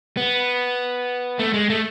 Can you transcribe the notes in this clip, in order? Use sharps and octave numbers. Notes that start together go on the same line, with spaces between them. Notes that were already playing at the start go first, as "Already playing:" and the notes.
B3
A3
G#3
A3